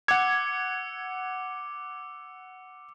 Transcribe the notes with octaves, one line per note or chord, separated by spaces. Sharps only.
F#5 D6 E6 G#6 C#7